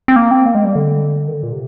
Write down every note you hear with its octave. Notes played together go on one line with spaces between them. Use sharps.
C4
A#3
C4
A#3
G#3
G3
D3
D#3
D3
A#2
C3